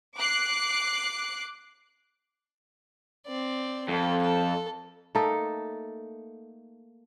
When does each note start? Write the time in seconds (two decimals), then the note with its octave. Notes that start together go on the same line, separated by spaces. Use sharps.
0.17 D6 F#6 C7
3.27 C4 D5
3.88 F2 A4
4.22 A4
5.15 A3 A#3 D#4 A4